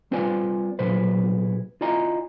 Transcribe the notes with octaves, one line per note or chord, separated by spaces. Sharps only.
G3 C4 F4 B4 D5 G#5
B1 A#2 F#3 G#4 B4 C5
E4 F4 D5 D#5 G#5 A#5